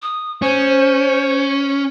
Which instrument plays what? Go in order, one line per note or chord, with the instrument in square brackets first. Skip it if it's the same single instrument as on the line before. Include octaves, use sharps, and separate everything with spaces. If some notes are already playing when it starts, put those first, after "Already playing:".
[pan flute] D#6
[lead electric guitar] C#4 [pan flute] C5